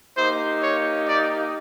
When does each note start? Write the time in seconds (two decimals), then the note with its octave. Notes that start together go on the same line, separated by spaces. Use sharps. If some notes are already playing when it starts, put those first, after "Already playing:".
0.17 A#3 D#4 G4 C5
0.63 C#5
1.07 D5